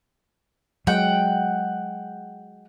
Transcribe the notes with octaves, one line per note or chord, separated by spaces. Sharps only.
F#3 G#3 F#5 G5